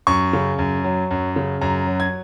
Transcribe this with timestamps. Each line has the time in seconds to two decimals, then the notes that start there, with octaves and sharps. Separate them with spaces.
0.07 F#2 C#6
0.33 C#3
0.59 F#2
0.84 F#3
1.11 F#2
1.36 C#3
1.61 F#2 A#5
1.87 F#3
2.00 G#6